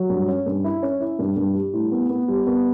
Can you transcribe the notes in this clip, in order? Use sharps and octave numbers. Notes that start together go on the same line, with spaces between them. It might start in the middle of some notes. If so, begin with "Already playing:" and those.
Already playing: F#3
G2
C#4
G2
E4
C#4
E4
G2
G2
G3
A2
B3
B3
G3
B3